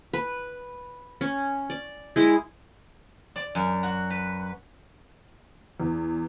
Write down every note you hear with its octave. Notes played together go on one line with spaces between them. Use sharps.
B4
C#4
D5
G#3 E4
D5
F#2
F#4
B4
E2